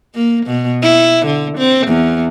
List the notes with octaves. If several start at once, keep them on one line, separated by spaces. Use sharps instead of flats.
A#3
B2
E4
D3
C4
E2